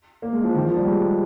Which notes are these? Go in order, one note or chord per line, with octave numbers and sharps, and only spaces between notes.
A#3
G#3
F3
D#3
F3
G3
G#3